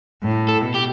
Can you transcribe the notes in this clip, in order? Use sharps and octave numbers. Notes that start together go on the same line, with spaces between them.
A2
A4
B2
G4